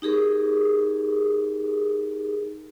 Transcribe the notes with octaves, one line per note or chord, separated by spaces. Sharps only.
D#4 G4 G#4 A#4